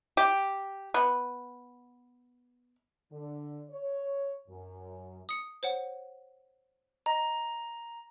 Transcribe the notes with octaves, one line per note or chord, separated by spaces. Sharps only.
G4
B3
D3
C#5
F#2
D#6 C#7
C5 C#5 F#5
D#5 A#5